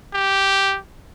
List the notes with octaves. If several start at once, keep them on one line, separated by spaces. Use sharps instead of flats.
G4